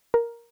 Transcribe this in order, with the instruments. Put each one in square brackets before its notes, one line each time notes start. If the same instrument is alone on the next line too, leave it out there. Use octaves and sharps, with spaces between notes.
[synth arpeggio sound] A#4